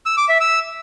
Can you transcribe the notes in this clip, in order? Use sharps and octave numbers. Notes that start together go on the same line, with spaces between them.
E6
D6
E5
E6